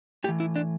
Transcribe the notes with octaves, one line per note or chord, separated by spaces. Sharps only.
A2 E3 G4
E4
D4